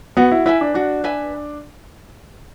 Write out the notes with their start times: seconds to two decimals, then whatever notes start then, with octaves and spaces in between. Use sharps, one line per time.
0.17 B3 F#4
0.32 E4
0.46 E4 B4 E5 G#5
0.61 D4
0.74 D4 F#4
1.04 B4 E5 G#5